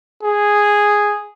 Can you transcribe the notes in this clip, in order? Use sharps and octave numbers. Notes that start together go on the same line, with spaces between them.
G#4